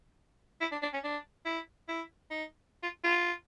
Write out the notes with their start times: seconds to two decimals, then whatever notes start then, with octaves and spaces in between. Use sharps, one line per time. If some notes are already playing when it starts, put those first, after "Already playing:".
0.61 E4
0.72 D4
0.82 D4
0.93 C#4
1.04 D4
1.45 E4
1.88 E4
2.30 D#4
2.83 F4
3.04 F4